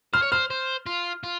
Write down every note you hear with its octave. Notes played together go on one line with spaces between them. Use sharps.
C5 F6
C#5
C5 F6
C5
F4
F4